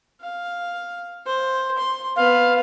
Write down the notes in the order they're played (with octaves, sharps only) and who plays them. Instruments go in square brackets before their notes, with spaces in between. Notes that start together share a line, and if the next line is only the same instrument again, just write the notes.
[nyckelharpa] F5
C5
C6
[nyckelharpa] B3 B4 [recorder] F5